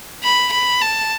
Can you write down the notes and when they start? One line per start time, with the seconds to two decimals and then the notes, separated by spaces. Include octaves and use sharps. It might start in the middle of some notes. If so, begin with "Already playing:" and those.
0.24 B5
0.53 B5
0.82 A5